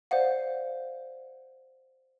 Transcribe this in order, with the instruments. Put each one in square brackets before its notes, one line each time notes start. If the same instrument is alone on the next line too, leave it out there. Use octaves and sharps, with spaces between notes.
[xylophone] C5 D5 F5 F#5